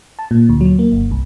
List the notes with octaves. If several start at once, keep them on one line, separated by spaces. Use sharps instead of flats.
A5
A#2
D2
F#3
A#3
G1
C2